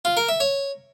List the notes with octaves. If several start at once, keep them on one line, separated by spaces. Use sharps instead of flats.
F4
A#4
E5
C#5